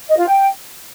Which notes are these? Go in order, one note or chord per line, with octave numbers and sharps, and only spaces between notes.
D#5
F4
G5